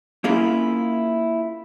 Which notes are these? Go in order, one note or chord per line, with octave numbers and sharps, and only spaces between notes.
A#3 C#4 E4 F4 G#4 A#4